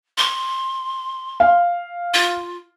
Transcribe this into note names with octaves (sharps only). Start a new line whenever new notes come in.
C6
F5
F4